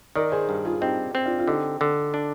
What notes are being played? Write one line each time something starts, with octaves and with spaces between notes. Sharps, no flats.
D#3 A#4 D5
G#4 C5
G2
F4 G#4
C4 D#4 G4
C4
D4 F4
F4
D3 D#4 G4
D3
D4